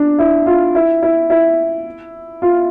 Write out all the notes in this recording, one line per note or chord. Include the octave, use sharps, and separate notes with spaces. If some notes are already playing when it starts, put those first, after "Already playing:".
Already playing: D4
E4
F4
E4
E4
E4
F4